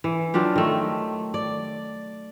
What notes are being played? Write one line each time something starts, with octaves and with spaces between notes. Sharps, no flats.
E3
F#3 D4 F4 G4
D#3 A3
D5